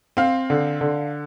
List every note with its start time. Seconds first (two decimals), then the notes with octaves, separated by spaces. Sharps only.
0.17 C4 F5
0.50 D3
0.81 D3